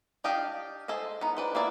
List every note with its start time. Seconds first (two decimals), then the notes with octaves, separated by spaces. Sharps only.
0.24 D4 G4 D#5 F5 G5
0.88 G#4 A4 C5 D#5
1.21 B3 D#4
1.37 D4 B4 C5
1.55 A#3 B3 D4 E4 D5